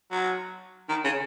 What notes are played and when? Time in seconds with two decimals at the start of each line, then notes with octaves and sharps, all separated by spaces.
0.11 F#3
0.89 D#3
1.04 C#3